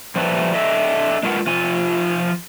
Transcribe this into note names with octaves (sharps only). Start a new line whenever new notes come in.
F3 G3 A3 B4
D4 A4 D#5 E5
G#3 D4 F4 A#4 B4 F#5
F3 F4 G#5